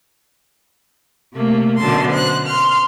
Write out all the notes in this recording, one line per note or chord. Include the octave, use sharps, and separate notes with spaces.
C3 A3 A#3
F#2 B2 D3 A5 C6
C5 F#6
C6 F6